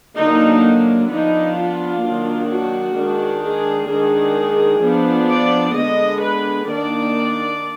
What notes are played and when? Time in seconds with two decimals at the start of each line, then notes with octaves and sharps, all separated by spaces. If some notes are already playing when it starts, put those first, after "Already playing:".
0.17 D3 F#3 A#3 D4 D#4
1.11 F3 B3 D4 D#4
1.57 F4
2.04 D#3 F#3 A#3 D4
2.50 F#4
2.96 D#3 G#3 D4
3.43 G#4
3.90 D#3 G#3 D4 G#4
4.82 F3 B3 D4
5.29 D5
5.75 D3 G#3 B3 D#5
6.22 B4
6.68 D#3 A#3 D4 D5